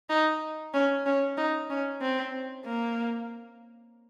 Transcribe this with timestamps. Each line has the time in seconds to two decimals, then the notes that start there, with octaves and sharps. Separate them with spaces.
0.09 D#4
0.73 C#4
1.06 C#4
1.37 D#4
1.70 C#4
2.01 C4
2.65 A#3